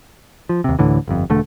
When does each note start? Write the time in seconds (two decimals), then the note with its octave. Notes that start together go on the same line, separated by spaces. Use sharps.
0.49 F3
0.64 D#2 C3
0.79 D2 A2 D3 E3
1.08 G1 F2
1.30 E1 D3 A3